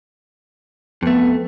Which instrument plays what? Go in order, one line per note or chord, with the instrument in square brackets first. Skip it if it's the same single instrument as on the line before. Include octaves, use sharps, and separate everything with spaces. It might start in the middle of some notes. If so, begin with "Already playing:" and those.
[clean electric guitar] F2 A3 [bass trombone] B3